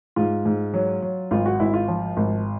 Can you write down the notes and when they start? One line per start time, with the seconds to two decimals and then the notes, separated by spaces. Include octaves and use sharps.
0.16 G#2 F4
0.45 G#2
0.74 F#3
1.02 F#3
1.31 G#1 F4
1.46 F#4
1.60 G#1 E4
1.74 F4
1.88 F3
2.17 G#1